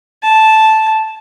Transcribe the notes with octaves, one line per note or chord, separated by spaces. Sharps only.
A5